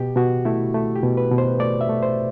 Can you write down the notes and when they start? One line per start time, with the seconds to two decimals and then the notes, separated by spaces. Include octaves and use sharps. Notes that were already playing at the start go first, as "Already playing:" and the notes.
Already playing: B2 G4
0.16 B2 F#4
0.45 A3 E4
0.75 A3
0.95 G4
1.03 B2
1.17 B4
1.32 B2
1.38 C5
1.59 A3 D5
1.81 E5
1.89 A3
2.02 C5